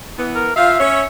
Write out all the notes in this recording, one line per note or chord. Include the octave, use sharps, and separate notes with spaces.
E3 B3
A#4
F3 F4 E5 F5
C#4 C#5